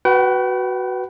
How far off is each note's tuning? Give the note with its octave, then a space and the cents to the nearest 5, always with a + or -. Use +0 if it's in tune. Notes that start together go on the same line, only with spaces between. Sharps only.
F#4 +5 B4 +0 G5 -40